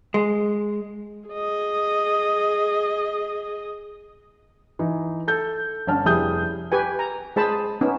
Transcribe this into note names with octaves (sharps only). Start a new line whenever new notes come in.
G#3
G#4 D#5
E3 D#4
A4 G6
G1 D3 C#4 A5 F6
F1 G3 E4 G#4 D#6 G6
G4 B4 G#5
A#5
G#3 G#4 C5 A5 B5
B3 C#4 D#4